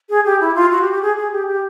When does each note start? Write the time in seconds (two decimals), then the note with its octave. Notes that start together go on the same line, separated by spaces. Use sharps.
0.10 G#4
0.25 G4
0.41 E4
0.55 F4
0.71 F#4
0.81 G4
0.92 G4
1.02 G#4
1.18 G#4
1.32 G4
1.47 G4